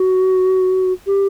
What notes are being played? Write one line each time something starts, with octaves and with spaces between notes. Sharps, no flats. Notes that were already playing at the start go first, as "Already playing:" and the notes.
Already playing: F#4
G4